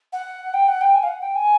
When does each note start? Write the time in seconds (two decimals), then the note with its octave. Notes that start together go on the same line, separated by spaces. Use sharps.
0.12 F#5
0.53 G5
0.68 F#5
0.81 G5
0.94 G#5
1.03 F5
1.08 F#5
1.22 G5
1.35 G#5